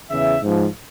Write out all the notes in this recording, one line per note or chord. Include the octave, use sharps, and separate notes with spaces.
E2 C#3 E3 E5
G#2 F3